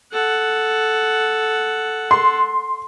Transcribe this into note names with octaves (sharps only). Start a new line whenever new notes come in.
A4 F#5
C6